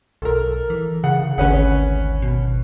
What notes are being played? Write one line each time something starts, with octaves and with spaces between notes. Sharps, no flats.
B1 A4 A#4
E3
C#3 F#5
G#1 D2 C#4 B4 F#5
B2